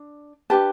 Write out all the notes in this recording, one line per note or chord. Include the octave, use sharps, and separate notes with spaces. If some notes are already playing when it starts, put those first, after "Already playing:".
Already playing: D4
D4 G4 B4 A5